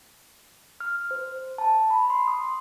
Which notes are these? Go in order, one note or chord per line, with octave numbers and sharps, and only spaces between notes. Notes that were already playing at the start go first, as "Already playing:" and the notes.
F6
C5
A5
B5
C6
D#6